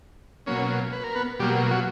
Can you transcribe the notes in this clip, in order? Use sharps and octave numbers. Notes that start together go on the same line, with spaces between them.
B2 F#3 A#3 C#4 C#5
B4
A#4
B3 B4
B2 F#3 G3 A#3 G4
F#3 F#4